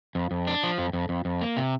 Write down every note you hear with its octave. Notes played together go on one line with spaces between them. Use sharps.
F2
F2
D4
F3
F2
F2
F2
F2
A#3
C3